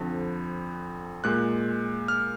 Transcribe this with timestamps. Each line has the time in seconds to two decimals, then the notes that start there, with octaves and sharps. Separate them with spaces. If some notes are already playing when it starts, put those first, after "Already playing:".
Already playing: F2 D3 F3
1.24 A#2 G#3 F#6
2.08 F6